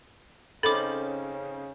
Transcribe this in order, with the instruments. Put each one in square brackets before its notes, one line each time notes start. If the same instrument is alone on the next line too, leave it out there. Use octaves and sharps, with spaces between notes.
[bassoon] C#3 [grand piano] C4 C#4 D#4 [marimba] A4 [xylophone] B5 D6